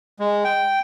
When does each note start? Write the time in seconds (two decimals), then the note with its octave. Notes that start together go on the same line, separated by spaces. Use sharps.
0.20 G#3
0.44 G5